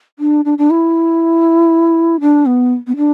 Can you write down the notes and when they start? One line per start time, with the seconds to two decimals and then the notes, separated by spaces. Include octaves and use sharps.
0.19 D4
0.45 D4
0.58 D4
0.70 E4
2.20 D4
2.46 B3
2.87 B3
2.96 D4